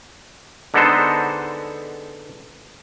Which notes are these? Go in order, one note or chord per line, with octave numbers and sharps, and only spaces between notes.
D3 G#3 B3 D#4 A4 C5